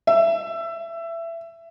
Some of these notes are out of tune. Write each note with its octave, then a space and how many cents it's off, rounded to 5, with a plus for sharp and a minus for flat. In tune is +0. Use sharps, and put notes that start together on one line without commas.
E5 +20